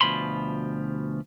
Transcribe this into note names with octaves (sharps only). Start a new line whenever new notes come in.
D2 B2 F3 B5 C6